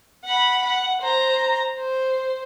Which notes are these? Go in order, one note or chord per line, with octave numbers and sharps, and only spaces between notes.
F#5 B5
F#5
C5 A#5
C5